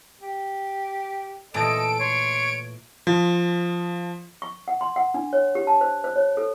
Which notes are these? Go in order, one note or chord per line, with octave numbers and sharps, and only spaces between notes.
G4
A#2 E3 A3 A4 D#5 D7
C#5 C6
F3
C#6
F#5
C6
F#5
D4
C#5
G4
A5
C5
C5
C#5
A4